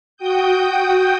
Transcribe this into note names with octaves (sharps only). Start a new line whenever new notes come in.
F#4 G5 D#6 G6